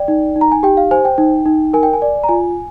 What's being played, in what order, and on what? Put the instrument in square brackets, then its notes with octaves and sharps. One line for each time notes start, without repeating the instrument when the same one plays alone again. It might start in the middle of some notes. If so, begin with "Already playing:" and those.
Already playing: [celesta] D5 G5
D#4
D#4
A#5
G#5
G4 G5
F5
C5 G#5
G5
D#4
D#4
A#4 G#5
G5
G#5
D5
A#5
F4 G#5